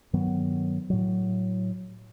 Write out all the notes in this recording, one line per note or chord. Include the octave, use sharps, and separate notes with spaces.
G2 D#3 F#3 B3
A2 F#3